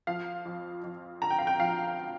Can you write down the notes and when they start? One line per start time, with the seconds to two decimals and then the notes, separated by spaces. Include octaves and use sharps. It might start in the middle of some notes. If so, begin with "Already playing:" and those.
0.07 F3 F5
0.45 F2
0.84 F2
1.21 D3 A#5
1.31 G5
1.39 F5
1.47 G5
1.60 F3 F5